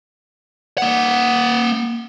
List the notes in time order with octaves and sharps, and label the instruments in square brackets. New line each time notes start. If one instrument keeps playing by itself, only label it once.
[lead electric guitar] A#3 F#5